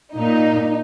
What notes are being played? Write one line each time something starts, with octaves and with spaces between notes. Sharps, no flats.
A#2 D#4